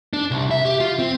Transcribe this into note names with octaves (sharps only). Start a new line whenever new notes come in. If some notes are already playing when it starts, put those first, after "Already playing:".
D4
C2
E5
G4
F4
C4